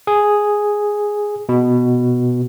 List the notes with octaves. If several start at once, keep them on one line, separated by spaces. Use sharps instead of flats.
G#4
B2